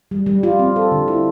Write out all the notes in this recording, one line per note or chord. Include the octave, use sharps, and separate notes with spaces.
G3
G3
F4
C4
A4
D3
E4